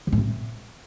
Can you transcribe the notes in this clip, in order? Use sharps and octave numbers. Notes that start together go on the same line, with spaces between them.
D3
A2
C3